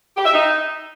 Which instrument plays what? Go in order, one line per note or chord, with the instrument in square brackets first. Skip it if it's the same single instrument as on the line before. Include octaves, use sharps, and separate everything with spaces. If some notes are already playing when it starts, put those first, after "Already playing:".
[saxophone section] G4
E5
D#4